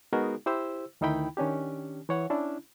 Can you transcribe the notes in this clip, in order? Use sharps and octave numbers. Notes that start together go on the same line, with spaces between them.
G#3 B3 D#4 F#4 G#4 A#4
E4 G4 C5 E6
D2 D#3 D#4 E4 G5 B5
D#3 C#4 D4 G4
E3 C#5 F#5
C#4 D4 E4